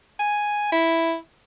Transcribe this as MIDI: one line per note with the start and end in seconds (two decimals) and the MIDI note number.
0.20 0.70 80
0.72 1.16 64